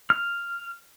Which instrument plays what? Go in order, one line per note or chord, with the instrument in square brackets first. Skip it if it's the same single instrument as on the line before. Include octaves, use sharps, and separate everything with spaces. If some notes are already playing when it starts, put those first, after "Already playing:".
[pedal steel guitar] F6